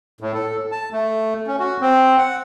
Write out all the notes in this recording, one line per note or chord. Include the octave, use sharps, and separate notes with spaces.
A2
A4
A5
A3
C#4
F#4
C4
F#5